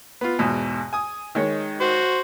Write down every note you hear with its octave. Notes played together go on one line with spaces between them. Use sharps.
B3 F4
E2 G#2 B2
G#5 D#6
D#3 G#3 C#5
F#4 C5